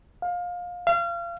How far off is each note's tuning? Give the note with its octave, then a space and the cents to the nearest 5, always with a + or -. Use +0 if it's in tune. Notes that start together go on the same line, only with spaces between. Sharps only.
F5 +25
F5 -30